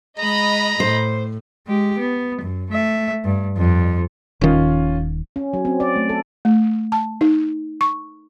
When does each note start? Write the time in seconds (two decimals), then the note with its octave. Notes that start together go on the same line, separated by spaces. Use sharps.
0.19 G#3 D#5 A#5 B5
0.80 A2 C5
1.67 G#3 G4
1.99 B3
2.41 F#2
2.71 A3 E5
3.25 G2
3.57 F2
4.41 D#1 D#3 C#4 F4
5.36 C#4
5.53 F#3
5.65 C4
5.80 D5
5.96 A3
6.09 A4
6.45 A3
6.92 A5
7.21 D#4
7.81 C#6